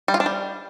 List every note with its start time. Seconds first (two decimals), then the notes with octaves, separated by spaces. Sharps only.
0.08 G3
0.14 F4
0.20 D4
0.26 G3